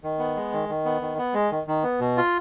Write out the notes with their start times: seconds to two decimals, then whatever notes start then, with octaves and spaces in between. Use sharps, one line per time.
0.03 D#3
0.19 B3
0.36 G#3
0.53 D#3
0.69 D#3
0.85 B3
1.02 D#3
1.18 B3
1.34 G#3
1.51 D#3
1.67 D#3
1.83 B3
2.00 B2
2.17 F4